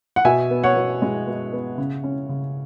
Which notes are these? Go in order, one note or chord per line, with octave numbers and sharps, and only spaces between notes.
F#5
B2 E5 G#5
B3
C#5 F#5
B2
G#3
B2
B3
C#3
C#4
C#3